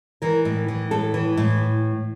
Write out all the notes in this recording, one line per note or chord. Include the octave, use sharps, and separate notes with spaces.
E3 A#4
A2
E3
A2 A4
E3
A2